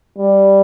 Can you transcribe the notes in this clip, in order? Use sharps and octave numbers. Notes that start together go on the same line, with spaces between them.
G3